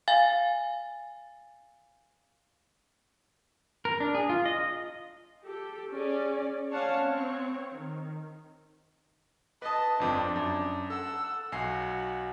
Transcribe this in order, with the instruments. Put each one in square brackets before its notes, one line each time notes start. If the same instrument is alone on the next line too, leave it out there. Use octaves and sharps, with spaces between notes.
[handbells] F5 G#5 A6
[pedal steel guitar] A#4
D4
G#4
F4
D#5
[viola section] G4 A4
C#4 G#4 D5
C#4 C#5 D5 F5 F#5 A5
C4 C#5
D#3
[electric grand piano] B4 D#6 [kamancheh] D#5 A5
[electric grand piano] G1 F2 C4 [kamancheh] D4
[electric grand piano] F#2
[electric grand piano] A4 [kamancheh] F#5 E6
[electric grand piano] B1 G#5 C7 [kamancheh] F#4